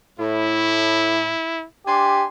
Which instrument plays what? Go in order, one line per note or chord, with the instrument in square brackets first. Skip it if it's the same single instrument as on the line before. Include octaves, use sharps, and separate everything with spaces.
[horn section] A2 [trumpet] E4
[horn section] D4 G#5 C6 [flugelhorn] G4